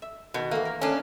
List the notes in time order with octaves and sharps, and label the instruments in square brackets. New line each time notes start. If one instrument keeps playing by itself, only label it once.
[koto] E5
[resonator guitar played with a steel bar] B2 [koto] D#3
[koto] E3 A3 [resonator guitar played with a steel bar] A#3
[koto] A#4
[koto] A3 D#5 G5 [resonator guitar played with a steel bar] C#4 D4